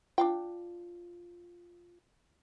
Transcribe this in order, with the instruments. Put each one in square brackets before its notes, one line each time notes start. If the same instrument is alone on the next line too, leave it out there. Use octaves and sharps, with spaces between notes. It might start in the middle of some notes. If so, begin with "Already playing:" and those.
[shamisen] D4 F5 G5 [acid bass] F4